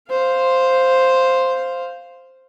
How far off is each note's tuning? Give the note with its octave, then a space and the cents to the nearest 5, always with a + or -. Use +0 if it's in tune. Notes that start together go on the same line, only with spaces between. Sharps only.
C5 +0 F5 +0